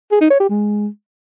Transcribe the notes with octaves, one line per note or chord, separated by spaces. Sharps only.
G#4
D#4
C#5
G4
G#3